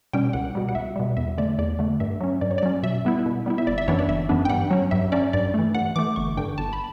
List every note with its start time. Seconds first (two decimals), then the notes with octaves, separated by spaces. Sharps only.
0.13 B2 G3 C#4 G5
0.33 C#2 F#5
0.55 B2 G3
0.69 F#5
0.75 C#2 E5
0.96 B2 G3
1.17 E2 E5
1.38 D3 A3 D5
1.58 E2 D5
1.79 D3 A3
2.00 G2 E5
2.21 F#3 C#4
2.41 G2 D5
2.51 C#5
2.58 D5
2.63 F#3 C#4
2.83 B2 E5
3.05 G3 B3 E4
3.26 B2
3.46 G3 B3 E4
3.58 E5
3.67 G1 D5
3.78 E5
3.88 F#2 E3 B3 D4 C#5
3.99 D5
4.09 G1 E5
4.29 F#2 E3 B3 D4
4.45 G5
4.50 G2 F#5
4.71 F#3 C#4
4.91 G2 E5
5.12 F#3 C#4 D5
5.33 G2 D5
5.54 E3 A3
5.75 G2 F#5
5.96 E3 A3 D6
6.16 G1 C#6
6.37 G2 D3 G5
6.58 G1 A5
6.73 B5